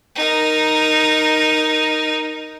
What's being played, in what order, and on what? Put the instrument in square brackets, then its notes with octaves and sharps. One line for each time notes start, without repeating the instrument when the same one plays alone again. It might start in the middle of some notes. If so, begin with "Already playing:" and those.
[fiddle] D#4 A#4